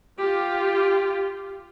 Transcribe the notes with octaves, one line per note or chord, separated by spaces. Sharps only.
F4 G4